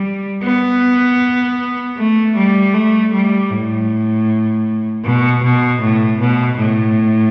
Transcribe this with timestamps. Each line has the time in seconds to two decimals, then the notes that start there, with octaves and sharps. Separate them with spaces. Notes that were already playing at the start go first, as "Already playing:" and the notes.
Already playing: G3
0.43 B3
1.97 A3
2.36 G3
2.74 A3
3.13 G3
3.51 A2
5.04 B2
5.44 B2
5.81 A2
6.20 B2
6.58 A2